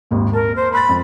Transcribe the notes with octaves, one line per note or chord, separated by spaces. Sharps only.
G#1 D#2 A#2
A#4 A5
C5
B5 C6 F#6 A6
F2